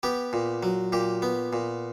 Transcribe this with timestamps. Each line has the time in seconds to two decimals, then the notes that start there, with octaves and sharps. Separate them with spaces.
0.03 B3 G4
0.33 A#2
0.63 F#3
0.92 A#2 G4
1.22 B3
1.53 A#2